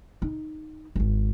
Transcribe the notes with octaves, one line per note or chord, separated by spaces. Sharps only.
D#4
D#1 G#1